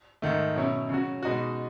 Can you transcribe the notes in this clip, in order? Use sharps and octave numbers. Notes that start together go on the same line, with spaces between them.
G#2 D#3 A3
B2 F#3 C#4 E4
C#3 F#3 C#4 F#4
B2 G#3 D#4 F#4